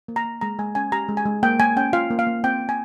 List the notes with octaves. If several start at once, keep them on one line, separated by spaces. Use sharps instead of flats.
A#3
A#5
A#3
G#3 A#5
G#3 G#5
C#4 G#5
G4 A#5
G#3
G#5
G#3
A#3 G5
A#3 G#5
C#4 G5
F4 F5
A#3
F5
A#3
C4 G5
C4
G#5